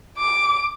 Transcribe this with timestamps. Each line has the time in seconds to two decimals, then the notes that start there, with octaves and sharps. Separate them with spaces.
0.17 D6